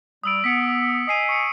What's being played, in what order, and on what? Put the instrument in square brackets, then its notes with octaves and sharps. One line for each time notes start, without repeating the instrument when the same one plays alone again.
[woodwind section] G3 [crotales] D#6 E6 D7
[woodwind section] B3 [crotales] B6 C#7 D7
[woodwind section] D#5 G#5 [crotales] D#6 C7 D#7
[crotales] C#6 C#7